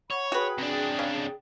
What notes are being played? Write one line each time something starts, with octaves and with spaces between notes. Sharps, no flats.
C#5 F#5 B5 C#6
F#4 G#4 B4 G5
C3 D4
C#3